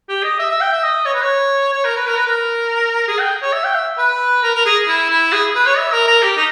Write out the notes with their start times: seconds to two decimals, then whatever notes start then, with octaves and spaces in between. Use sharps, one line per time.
0.09 G4
0.23 D#5
0.38 E5
0.50 E5
0.61 G5
0.72 E5
0.83 D#5
1.06 C#5
1.14 B4
1.22 C#5
1.73 C#5
1.84 A#4
1.96 B4
2.07 A#4
2.16 B4
2.26 A#4
3.08 G#4
3.19 G5
3.42 C#5
3.53 E5
3.64 G5
3.75 E5
3.98 B4
4.43 A#4
4.54 A#4
4.65 G#4
4.87 E4
5.10 E4
5.33 G#4
5.55 B4
5.66 C#5
5.77 E5
5.92 A#4
6.07 A#4
6.22 G4
6.37 D#4